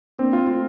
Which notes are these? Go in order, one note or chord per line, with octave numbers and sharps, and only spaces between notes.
A#3 C4 D4
F4
A3 C4 F4